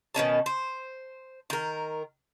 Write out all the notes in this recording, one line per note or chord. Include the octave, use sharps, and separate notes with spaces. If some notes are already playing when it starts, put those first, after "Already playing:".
B2 D#3 C#4 A5
C5
D#3 A#4